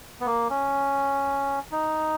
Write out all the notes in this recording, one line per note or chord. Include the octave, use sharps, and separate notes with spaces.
B3
A#3
C#4
D#4